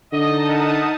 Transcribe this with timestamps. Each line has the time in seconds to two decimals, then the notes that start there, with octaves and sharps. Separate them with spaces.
0.12 D3 D#4 D#5 A5 D#6
0.49 A#4 E5 F#5